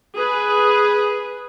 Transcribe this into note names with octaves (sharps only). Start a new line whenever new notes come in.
G#4 B4